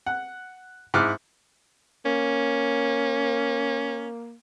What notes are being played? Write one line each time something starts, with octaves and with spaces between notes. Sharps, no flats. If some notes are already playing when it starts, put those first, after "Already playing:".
F#5
G#2 E4 D6 F6 F#6
A#3 C#4